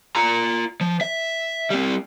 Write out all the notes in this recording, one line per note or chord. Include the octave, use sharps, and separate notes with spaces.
F4 A#5
F3
E5
G3 C4